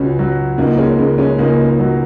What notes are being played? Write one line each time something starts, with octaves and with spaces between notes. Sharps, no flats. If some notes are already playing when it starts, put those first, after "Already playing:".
Already playing: C#2 C#4 F#4
F#3
C#2 A#3 D#4
A#3
G#3 C#4
C#3 A#3
G#3 C#4
C#2 A#3 D#4
F#3